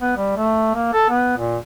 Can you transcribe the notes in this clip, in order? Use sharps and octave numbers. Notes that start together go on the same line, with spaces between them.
B3
G3
A3
A#3
A4
B3
A#2